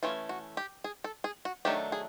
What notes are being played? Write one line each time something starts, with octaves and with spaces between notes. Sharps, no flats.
E3 A3 C#4 F4
F#4
G4
G#4
A4
G#4
F#4
D#3 F#3 A3 D4 G4
G#4